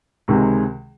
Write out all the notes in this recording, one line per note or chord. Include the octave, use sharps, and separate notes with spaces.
C#2 C3 D#3 G#3